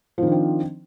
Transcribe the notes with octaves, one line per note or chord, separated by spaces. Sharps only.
D#3 F3 C4 D4